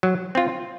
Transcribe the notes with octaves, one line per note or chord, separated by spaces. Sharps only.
F#3
C4 F4